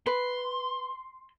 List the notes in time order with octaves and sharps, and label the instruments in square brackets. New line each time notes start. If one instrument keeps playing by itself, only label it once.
[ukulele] B4 [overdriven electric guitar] C6